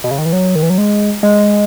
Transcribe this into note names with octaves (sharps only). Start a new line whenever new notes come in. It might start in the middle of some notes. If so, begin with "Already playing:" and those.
B2
C#3
D#3
E3
F#3
D#3
E3
F#3
G#3
G#3